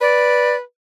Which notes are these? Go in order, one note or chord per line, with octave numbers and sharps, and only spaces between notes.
B4 D5